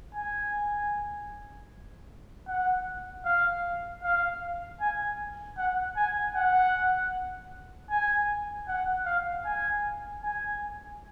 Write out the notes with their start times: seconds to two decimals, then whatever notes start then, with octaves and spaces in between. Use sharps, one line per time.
0.15 G#5
2.48 F#5
3.25 F5
4.03 F5
4.81 G#5
5.57 F#5
5.96 G#5
6.35 F#5
7.90 G#5
8.68 F#5
9.06 F5
9.45 G#5
10.23 G#5